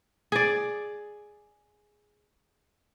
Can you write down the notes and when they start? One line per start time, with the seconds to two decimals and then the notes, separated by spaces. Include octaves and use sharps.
0.32 G#4 D5